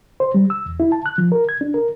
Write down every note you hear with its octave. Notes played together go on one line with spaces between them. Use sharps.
C5
G3
E6
E2
E4
A5
F#6
F3
A#4
G#6
D4
A#4